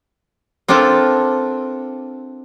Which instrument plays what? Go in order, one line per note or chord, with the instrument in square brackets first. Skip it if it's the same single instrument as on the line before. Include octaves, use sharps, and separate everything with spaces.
[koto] C4 D4 F4 A4 A#4